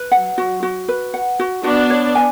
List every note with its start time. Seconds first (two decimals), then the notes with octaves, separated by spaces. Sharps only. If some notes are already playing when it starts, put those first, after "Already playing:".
Already playing: B4
0.12 F#3 F#5
0.38 F#4
0.63 F#4
0.88 B4
1.14 F#5
1.39 F#4
1.64 B3 D4 F#4
1.90 C#5
2.15 G#5